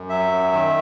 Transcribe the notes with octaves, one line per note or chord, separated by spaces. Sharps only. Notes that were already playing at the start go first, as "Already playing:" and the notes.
Already playing: F#2
F#3 E5
F#2
D#3